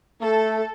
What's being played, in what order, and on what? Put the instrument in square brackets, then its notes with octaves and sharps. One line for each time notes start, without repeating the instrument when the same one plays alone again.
[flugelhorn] A3 [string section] A4